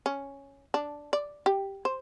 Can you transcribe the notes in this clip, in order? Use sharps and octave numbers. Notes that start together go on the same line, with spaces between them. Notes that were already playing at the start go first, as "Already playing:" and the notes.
C#4
D4
D5
G4
C5